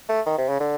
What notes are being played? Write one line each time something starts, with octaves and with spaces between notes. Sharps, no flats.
A3
D#3
C3
C#3
D3